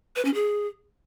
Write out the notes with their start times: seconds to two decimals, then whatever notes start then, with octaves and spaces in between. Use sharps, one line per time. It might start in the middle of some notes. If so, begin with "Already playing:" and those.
0.16 B4
0.25 C#4
0.34 G#4